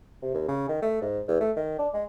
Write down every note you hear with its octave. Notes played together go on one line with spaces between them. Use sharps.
C3
D#2
C#3
D#3
A3
G#2
E2
A3
D#3
D4
G#3